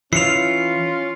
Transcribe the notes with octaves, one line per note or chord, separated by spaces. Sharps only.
E3 C#4 F4 C7 C#7 F7